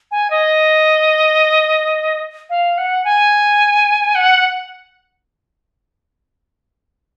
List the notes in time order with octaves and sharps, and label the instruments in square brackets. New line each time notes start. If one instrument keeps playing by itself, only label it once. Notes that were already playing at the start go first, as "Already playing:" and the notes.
[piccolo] G#5
D#5
F5
F#5
G#5
F#5